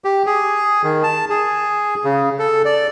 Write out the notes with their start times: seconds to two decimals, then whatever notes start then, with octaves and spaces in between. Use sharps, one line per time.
0.05 G4
0.26 G#4
0.84 D#3
1.03 A5
1.30 G#4
2.04 C#3
2.39 A4
2.65 D5